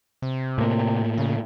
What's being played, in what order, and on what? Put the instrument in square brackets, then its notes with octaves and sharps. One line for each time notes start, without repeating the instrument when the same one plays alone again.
[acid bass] C3
[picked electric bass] A2 A#3
[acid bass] C#3